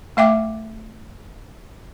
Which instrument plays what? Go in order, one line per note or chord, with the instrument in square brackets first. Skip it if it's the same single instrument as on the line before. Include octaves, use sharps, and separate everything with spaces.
[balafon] A3 E5 G5 D6